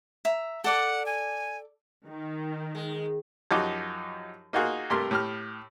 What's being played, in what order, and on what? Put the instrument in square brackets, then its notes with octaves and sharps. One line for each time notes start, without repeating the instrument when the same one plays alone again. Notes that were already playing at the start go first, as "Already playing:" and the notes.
[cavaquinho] E5 A#5
[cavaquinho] A4 D5 D6 [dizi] F#5
[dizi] G#5
[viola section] D#3
[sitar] G#3
[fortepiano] F#2 F3 D#4 F#4 G4 D6
A#3 D#4 F4 F#4 G#4
G2 C3 A3 A#4 C6
A2 G4 F6